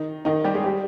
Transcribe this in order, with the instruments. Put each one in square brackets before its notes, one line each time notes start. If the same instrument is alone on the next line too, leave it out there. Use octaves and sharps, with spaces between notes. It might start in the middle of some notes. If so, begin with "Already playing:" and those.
Already playing: [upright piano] D#3 D#4
D#3 D#4
G3 G4
G#3 G#4
G3 G4